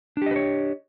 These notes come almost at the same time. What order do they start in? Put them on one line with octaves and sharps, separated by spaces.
D4 G4 D#5 B4 C#5